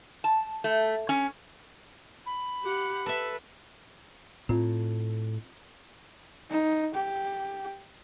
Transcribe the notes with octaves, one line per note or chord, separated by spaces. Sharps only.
A5
A3
C#4
B5
G4 F#5
A4 B4 E5
A2 C4 F4
D#4
G4